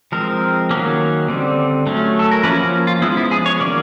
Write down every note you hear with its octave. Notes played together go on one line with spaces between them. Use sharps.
F3 G#3 C4 A#4
D#3 F#3 A#3 C#4
D3 G3 C4
F#3 A3 C#4
A4
A#4
F3 A#3 C#4 B4
F#4
F4
F3 G#3 B3 E4
E4
G#4
C#5
D#3 F#3 A#3 C#4 D5